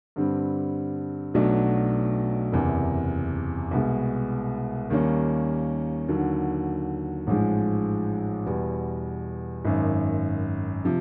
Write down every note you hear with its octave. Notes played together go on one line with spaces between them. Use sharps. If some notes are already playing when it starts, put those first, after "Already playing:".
G2 D3 G3 C4
B1 B2 F#3 A3 D4
F#1 E2 C3
C2 B2 G#3
D#2 D#3 G3 A#3 C#4
D#2 D3 F#3
A1 G#2 F3 G#3
E2 B2 G3
G#1 F#2 D#3
C3 F3